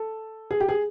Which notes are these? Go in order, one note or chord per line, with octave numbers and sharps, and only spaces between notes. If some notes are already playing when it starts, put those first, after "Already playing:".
Already playing: A4
G#4
G4
G#4